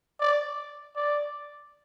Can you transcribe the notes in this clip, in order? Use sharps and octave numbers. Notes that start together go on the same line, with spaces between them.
D5
D5